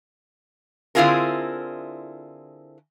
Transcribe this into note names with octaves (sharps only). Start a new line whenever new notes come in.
D3 C4 E4 F4 G#4 A#4